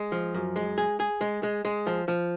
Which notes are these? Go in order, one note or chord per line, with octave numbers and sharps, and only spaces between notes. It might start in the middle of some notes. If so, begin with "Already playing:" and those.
Already playing: G#3
F3
F#2
G#3
G#4
G#4
G#3
G#3
G#3
F3
F3